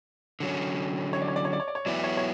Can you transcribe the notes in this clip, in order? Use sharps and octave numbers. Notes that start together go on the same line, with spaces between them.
D3 F#3 C#4
C#5
D5
C#5
D5
C#5
D5
C#5
D5
C#5
F#3 B3 E4 D5
C#5
C#5